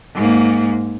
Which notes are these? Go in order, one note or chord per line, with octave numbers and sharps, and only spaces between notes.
G#2 A#3